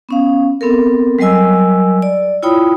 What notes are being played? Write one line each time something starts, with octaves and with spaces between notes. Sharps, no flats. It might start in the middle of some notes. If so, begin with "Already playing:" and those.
B3 C#4 F5
B3 C4 A4 A#4
F#3 G3 A#4 D#5 G#5 E6
D5
E4 F4 C#5 G5 B5 D#6